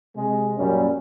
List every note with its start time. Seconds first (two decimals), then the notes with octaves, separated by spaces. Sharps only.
0.16 C3 G#3
0.58 F#2 A#2 G3 C#4